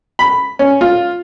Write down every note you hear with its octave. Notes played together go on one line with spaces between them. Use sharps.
B5
C#4
F4